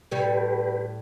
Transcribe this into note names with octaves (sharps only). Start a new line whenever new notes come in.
A2 G3 G4 B4